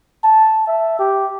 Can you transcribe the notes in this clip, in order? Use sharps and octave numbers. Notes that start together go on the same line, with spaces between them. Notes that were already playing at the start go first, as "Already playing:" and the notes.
A5
E5
G4